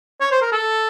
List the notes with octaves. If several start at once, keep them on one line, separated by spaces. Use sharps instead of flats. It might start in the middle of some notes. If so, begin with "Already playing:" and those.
C#5
C5
A#4
A4